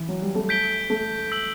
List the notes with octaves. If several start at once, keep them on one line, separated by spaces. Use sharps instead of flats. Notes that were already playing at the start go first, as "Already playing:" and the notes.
Already playing: E3
F#3
G3
A3
G6 B6 D7 G7
A3
E6 B6 F#7